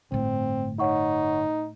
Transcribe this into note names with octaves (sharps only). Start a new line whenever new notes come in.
G1 A2 A3 C4
D#4 C#5 F#5 C#6